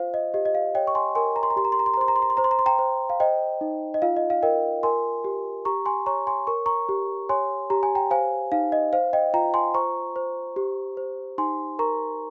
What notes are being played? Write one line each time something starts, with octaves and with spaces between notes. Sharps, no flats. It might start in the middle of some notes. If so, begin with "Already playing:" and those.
Already playing: F4 C5 F5
D#5
G4 D#5
D#5
F5
C#5 D#5 G5
C#6
G#5 C6
A#4 G#5 C6
A#5
C6
A#5
G4 C6
A#5
C6
A#5
C6
A#5
C5 C6
A#5
C6
A#5
C6
C5 A#5
C6
A#5
C6
G5 A#5
C5
F5
C5 D#5 G5
D#4
D#5
F4 F5
D#5
F5
A#4 D#5 G5
A#4 G#5 C6
G4
G4 A#5 C#6
G#5 C6
C#5 A#5 C#6
G#5 C6
A#4 C#6
A#5 C#6
G4
C#5 G#5 C6
G4 A#5
G#5
G5 A#5
C5 F5 G#5
D#4 F5
D#5
C5 F5
D#5 G5
F4 G5 A#5
G#5 C6
C5 A#5 C#6
C5
G4
C5
D#4 G#5 C6
A#4 A#5 C#6